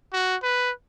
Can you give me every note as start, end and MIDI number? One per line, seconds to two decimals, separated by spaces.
0.13 0.36 66
0.43 0.72 71